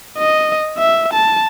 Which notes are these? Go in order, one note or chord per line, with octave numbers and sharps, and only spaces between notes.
D#5
E5
A5